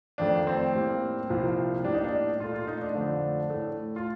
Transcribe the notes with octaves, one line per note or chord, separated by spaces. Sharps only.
F2 D#3 A3 D4
C4
A2 G3 A#3
C2 A#2 F3 A#3
A2 G3 A#3 D4
D#4
D4
A#2 A3 F4
F4
D#4
D4
F2 D3 A3
A2 A3
F4